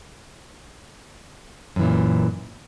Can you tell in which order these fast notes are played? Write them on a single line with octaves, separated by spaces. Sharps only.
F#2 E3 A#2